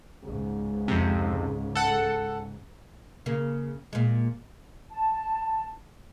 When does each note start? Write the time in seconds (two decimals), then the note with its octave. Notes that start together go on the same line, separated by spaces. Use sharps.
0.23 C#2 G#2
0.88 F2 C3
1.76 A4 F#5
3.26 C#3 A#3
3.93 A#2 G#3
4.90 A5